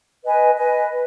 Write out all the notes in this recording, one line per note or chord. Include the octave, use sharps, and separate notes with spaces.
B4 D#5 G#5
B4 D#5 G#5
B4